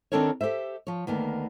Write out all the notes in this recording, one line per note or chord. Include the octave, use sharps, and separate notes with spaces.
D#3 C4 D4 A4 A#4 C#5
G4 A4 C5 E5
F3 C#5
D2 D#3 A#3 B3